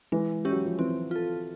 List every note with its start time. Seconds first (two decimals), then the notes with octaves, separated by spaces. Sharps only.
0.12 E3 G#3
0.45 C#4 E4 G4
0.51 F#3
0.65 F3
0.79 E3 C4
1.11 F4 A4